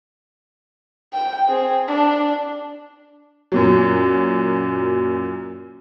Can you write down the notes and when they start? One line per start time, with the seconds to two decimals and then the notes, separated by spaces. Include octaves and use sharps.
1.13 G5
1.48 C4 G#4
1.88 D4
3.52 F#2 A#2 F#3